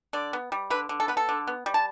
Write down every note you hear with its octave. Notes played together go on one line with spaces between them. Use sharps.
D3 D5
B3
G3
D3 B4
D3
A4
B3 B4
A4
D3
B3
G3
A5